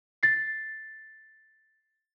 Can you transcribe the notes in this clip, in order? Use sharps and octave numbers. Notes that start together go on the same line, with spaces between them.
A6 C7